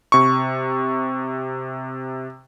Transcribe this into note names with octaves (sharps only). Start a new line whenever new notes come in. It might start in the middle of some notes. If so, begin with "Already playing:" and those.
C3 C#6